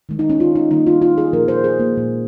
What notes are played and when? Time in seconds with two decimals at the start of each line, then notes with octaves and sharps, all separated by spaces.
0.09 D#3 G#3
0.19 D#4
0.30 C#4
0.40 F4
0.55 D#4
0.71 D#3 G3 A#3 D#4
0.87 F4
1.02 F4
1.18 G#4
1.33 A#2 F3 A#3 A#4
1.48 C5
1.64 G#4
1.79 A#3
1.95 A#2 F3 G#3